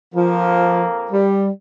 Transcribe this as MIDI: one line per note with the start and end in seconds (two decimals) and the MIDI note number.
0.14 1.23 41
0.14 0.83 53
0.14 1.23 58
1.11 1.48 55